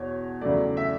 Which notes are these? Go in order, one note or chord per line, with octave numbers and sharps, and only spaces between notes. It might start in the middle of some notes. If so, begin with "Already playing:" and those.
Already playing: E2 B2 C#5
E2 C#3 F#3 A3 D5
E5